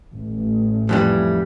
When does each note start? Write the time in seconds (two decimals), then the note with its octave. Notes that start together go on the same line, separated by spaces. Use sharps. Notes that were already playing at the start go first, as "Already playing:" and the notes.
0.12 A1
0.89 F2 E3 G3